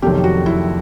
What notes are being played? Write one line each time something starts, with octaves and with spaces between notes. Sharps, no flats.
F1 F2 C3 D#3 F#3 G4
F#4
E4